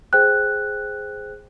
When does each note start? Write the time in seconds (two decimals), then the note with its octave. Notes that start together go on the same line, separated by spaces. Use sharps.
0.13 G#4 C5 G5 F#6